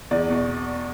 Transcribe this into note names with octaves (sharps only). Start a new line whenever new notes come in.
E2 D5
B2